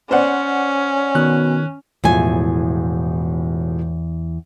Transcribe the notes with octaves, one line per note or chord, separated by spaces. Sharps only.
C#4 C5 D5 F#5
B2 D#3 F#6
E1 E2 A2 F3 G#5